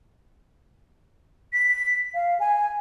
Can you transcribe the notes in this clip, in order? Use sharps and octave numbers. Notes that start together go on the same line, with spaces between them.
B6
F5
G#5